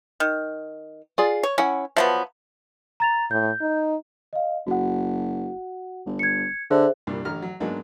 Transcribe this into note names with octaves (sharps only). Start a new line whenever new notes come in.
D#3
F4 G#4 D5
C#5
C#4 E4 F#5
F3 F#3 B3 E5 A5
A#5 A6 F7
A2 G6
D#4
D#5 F5
F#1 F#4 F#5
G1
G#6 C#7
D3 G#4 C5 E5
C2 G2 A#2
A1 D3 A#5 F6
F#3
G#2 F#3 G#3 A#3 B3 D4